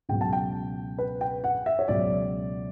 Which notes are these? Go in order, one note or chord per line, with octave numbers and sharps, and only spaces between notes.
C#2 B2 F#3 G5
A5
G5
B4
G5
F#5
E5
C#5
C#2 B2 F#3 D5